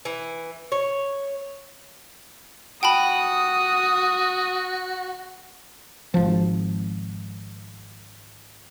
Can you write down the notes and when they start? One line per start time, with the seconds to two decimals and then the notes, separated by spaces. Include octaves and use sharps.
0.05 E3
0.72 C#5
2.83 F#4 G5 A5 B5 D#6
6.14 G#1 F3